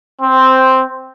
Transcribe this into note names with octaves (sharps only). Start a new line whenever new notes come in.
C4